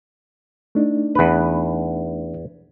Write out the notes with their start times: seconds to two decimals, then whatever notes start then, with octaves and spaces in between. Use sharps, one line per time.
0.75 A3 D4 D#4
1.15 E2 B4